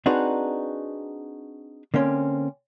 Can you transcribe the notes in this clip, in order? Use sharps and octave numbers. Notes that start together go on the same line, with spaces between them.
C4 D4 D#4 F#4 G#4 B4
D3 A#3 C4 C#4